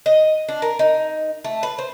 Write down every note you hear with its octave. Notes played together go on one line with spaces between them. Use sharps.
D#5
D4
A#4
D#4
A3
B4
C5